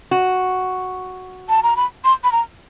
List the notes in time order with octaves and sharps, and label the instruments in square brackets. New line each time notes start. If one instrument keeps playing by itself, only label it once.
[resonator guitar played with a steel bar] F#4
[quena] A5
A#5
B5
C6
B5
A#5